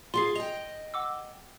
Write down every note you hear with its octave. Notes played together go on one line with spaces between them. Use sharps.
F4 G4 G#4 C6 C7
D#5 G5 F7
F#5 D6 E6